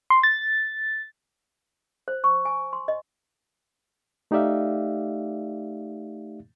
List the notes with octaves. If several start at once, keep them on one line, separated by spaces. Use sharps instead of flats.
C6
A6
C5
C#6
G#5
C6
D#5
A3 D#4 G4 D5 E5 F5